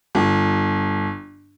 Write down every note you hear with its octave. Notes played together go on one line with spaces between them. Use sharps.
G1